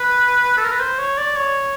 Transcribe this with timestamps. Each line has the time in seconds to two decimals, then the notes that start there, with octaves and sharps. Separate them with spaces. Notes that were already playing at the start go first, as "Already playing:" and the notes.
Already playing: B4
0.57 A4
0.64 A#4
0.72 B4
0.80 C5
0.99 C#5
1.18 D5
1.36 C#5